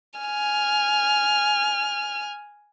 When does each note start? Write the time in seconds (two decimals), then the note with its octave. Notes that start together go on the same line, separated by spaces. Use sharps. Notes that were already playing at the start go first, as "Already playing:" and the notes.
0.20 G#5 F6